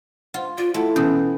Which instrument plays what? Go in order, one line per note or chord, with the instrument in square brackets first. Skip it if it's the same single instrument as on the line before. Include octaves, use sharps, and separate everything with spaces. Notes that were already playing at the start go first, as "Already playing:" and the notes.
[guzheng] F4 [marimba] C5 F5 F#5
[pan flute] F4 [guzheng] D5
[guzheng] A3 [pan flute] E4 [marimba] F#5 A5 C6
[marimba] B2 B3 [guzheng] E3 [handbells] C#4